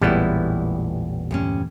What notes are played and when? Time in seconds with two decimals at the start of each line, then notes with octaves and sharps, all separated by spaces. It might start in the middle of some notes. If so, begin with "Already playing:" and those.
0.01 A1 E2 A#2 G3 G#3 B3 E4
1.31 D2 G2 C#4